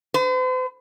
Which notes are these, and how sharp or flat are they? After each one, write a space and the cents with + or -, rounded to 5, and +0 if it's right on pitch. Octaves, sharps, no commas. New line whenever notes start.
C5 -45